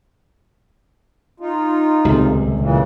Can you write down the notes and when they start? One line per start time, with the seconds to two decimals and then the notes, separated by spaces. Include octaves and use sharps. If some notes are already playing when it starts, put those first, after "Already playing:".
1.40 D#4 F4
2.05 D#1 C#2 C3 A4
2.60 A#2 C#3 E3